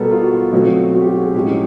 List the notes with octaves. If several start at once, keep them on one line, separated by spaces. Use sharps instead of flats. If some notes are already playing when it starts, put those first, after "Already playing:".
Already playing: B2 G3 B3 A4 A#4
F4
F#4
F4
B2 F#3 A3 C4
F#4
G4
F#4
G#4
A2 F3 G#3 C#4 G4